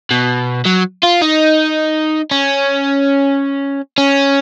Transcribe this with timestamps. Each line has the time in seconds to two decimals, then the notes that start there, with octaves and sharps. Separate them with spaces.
0.11 B2
0.65 F#3
1.03 F4
1.21 D#4
2.31 C#4
3.98 C#4